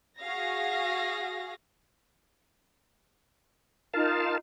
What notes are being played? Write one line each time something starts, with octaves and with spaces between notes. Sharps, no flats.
F#4 G#4 F5 A#6
D#4 F4 A#4 F5 A5